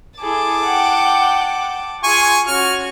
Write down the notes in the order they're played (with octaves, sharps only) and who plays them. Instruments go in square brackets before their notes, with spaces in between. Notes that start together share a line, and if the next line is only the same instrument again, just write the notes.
[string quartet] E4 G#4 A4 [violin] A5 D6
[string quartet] F#5 G5
[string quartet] F4 [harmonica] G#4 G#5 C#6
[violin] C#4 C#6 [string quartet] F#4 G#6 [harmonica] F6